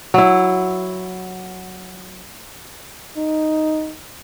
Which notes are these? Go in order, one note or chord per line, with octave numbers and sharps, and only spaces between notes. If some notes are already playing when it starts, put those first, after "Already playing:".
F#3 E4
D#4